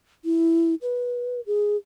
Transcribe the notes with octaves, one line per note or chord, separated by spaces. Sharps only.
E4
B4
G#4